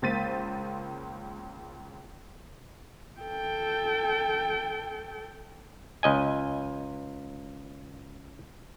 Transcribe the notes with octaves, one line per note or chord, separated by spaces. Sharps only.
C#2 A#3 C5 A6 B6 D#7
A4 G5
C#2 D#5 G#5